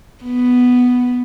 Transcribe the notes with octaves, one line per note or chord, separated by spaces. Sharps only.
B3